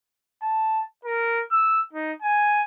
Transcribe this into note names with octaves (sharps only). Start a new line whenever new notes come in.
A5
A#4
E6
D#4
G#5